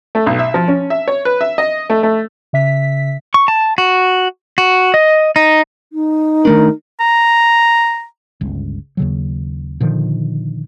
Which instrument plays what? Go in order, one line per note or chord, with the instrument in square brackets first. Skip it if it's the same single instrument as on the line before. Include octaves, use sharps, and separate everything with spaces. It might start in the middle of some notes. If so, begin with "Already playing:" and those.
[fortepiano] A3
B1
E5
F3
C#4
E5
C#5
B4
E5
D#5
A3
A3
[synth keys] C#3 E5 B6
[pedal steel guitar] C#6
A5
F#4
F#4
D#5
D#4
[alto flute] D#4
[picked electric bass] D#3 A3 D4 [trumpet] A#4
[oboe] A#5
[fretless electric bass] G1 C#2
D#2 C#3 F#3
A#2 D3 D#3 F3